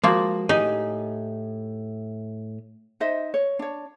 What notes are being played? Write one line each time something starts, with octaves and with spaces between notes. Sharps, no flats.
F3 G#3 A#3 F#4
A2 D#4 G4 G#4
D#4 C5 D#5 E5
C#5
D4 C#5